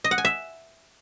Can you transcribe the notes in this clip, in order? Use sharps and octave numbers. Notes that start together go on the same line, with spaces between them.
D#5
F#5
G#5
E5